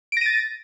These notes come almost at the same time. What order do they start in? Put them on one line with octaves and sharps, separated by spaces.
D7 A#6 D#7 A6